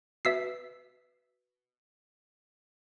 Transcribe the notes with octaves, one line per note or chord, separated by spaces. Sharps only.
F#4 B4 E5 E6 C7